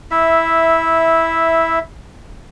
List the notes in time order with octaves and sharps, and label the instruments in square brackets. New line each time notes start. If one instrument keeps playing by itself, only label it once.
[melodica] E4 E5